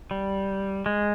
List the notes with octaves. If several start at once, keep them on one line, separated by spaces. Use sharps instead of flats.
G3
G#3